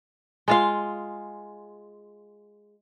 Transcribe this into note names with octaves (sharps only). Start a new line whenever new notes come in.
G#3 F4 F5